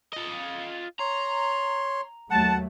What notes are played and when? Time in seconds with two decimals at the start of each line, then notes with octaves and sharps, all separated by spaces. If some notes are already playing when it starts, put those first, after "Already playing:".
0.13 F4 D#5
1.00 C#5 A#5 C6
2.30 D#2 F#3 A3 F#5 A5